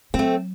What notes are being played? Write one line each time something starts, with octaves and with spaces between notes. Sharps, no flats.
F#3 C4
A3